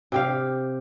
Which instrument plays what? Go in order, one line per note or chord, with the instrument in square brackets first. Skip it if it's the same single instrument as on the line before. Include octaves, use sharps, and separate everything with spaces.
[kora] C3 G4 F5